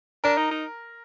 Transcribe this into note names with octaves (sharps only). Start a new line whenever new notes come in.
D4 A#4
D#4
D#4